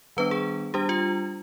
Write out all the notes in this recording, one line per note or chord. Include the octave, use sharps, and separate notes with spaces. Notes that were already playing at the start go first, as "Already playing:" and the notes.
D#3 G3 B3 D4 B4
G#4
G3 D4 G4
F4